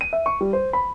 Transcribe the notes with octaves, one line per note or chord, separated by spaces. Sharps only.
D#7
E5
C#6
G3
C5
B5